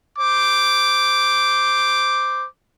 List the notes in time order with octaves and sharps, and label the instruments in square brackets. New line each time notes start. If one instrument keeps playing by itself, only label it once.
[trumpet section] C5 D6